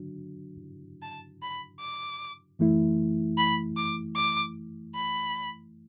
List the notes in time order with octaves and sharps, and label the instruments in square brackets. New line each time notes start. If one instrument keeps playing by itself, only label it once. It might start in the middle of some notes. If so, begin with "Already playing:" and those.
Already playing: [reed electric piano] D3 F#3 D4 F#4
[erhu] A5
B5
D6
[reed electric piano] F#2 E3 A3 E4
[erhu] B5
D6
D6
B5